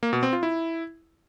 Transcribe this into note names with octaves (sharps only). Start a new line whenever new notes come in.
A#3
B2
C4
F4
E4